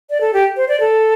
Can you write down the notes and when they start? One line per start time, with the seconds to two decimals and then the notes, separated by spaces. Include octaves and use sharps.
0.10 D5
0.21 A4
0.34 G4
0.57 C5
0.68 D5
0.80 A4